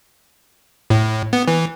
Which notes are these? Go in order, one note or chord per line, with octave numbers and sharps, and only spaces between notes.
A2
B3
E3